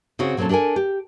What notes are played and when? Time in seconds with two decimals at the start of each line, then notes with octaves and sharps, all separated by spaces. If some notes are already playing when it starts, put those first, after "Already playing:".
0.19 C#3 C4 F#4 C#5
0.37 A#2 F#3 C4 C#4 A4
0.49 D4 G4 A4 A#4 G#5
0.76 G4